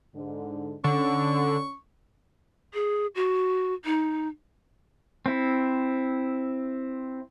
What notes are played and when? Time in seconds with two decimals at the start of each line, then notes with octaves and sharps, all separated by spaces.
0.15 G#2 D3
0.84 D3 C#4 C#6
2.74 G#4
3.15 F#4
3.85 D#4
5.26 C4 E4